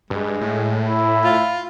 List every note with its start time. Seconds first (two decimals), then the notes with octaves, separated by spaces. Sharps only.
0.10 G2 G#3
0.41 A2
0.89 E4
1.24 F4